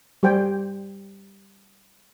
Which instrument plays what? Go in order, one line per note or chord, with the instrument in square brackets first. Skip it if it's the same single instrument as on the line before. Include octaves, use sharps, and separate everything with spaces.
[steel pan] G3 G4 C5 G5 G#5